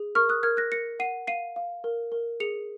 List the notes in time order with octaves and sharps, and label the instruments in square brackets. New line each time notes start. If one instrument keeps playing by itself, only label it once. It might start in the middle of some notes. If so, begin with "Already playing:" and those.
Already playing: [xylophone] G#4
A#4 C#6 F6
D#6 F#6
A#4 F6 G#6
F#6 A#6
A#4 A#6 C#7
F#5 C7 D#7
F5 C7 D#7
F5
A#4
A#4
G#4 C#7 F7